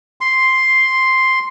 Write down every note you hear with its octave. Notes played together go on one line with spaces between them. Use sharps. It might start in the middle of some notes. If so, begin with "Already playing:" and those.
C6